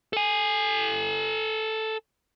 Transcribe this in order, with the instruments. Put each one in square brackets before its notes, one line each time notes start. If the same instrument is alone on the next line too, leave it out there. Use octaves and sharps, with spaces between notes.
[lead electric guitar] A4 G#5